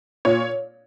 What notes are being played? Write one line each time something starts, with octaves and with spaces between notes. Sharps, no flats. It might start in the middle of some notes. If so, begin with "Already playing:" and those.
A#2 C#5